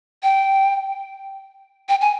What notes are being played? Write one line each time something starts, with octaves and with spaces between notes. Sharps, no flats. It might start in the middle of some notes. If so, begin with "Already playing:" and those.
G5
G5
G#5